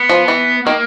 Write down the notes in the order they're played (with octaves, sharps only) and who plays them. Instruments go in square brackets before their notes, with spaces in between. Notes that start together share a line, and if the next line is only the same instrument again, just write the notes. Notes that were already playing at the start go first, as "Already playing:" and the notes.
Already playing: [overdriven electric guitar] B3
[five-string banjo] F3
E3
[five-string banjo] D#3 [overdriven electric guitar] A#3